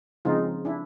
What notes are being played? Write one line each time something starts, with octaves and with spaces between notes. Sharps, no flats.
C#3 F3 G#3 C4 D#4 F4
D4 E4